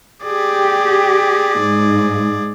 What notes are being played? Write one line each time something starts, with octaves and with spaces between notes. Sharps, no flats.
G4 G#4 D5
G#2